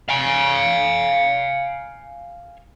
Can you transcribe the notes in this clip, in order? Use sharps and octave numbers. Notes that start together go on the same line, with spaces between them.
F5 G#5